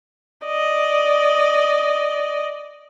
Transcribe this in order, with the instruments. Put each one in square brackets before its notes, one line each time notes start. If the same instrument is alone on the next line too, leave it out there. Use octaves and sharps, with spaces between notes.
[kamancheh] D5 D#5